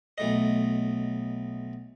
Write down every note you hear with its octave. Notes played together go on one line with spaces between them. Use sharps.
B1 A3 D#5